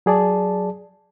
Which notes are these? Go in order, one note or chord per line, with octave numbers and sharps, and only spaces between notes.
F#3 G#4 D5 A5